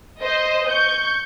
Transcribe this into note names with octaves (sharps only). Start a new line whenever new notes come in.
C5 D#5
C#6 G6